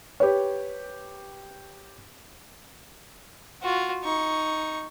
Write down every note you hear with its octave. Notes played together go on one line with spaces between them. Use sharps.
G4 B4 C#5
F4 F#4
D#4 C#6